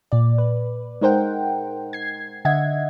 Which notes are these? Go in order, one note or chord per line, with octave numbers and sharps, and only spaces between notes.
A#2 D5
B4
G#3 D#4 A#4 C5 F#5 G5
G#6 C7
D3 D#5 E5 F#5 G#6